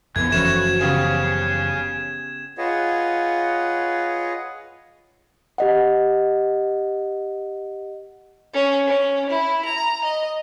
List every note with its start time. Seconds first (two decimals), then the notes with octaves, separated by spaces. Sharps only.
0.16 F2 D3 E3 B3 G#6
0.32 F#1 E3 F3 A3 C#4 F#4 B4 E7
0.81 C#3 B3 G4 G#4 C#5 F5
2.58 F4 G#4 B4 C#5 D#5 F#5
5.58 G4 D#5 F#5
8.54 C#4
8.87 C#4
9.29 E4
9.65 A#5
10.04 D#5